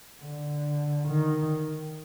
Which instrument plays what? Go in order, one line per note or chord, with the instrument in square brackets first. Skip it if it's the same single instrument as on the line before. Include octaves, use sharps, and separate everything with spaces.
[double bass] D3
D#3